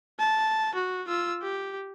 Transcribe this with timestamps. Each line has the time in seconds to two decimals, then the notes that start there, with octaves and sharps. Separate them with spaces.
0.19 A5
0.75 F#4
1.08 F4 E6
1.42 G4